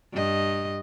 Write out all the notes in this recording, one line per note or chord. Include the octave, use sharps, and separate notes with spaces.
G2 D#5